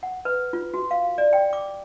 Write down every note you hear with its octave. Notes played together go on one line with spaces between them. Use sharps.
F#5
B4
F4
F#4
F5
D5
G5
D6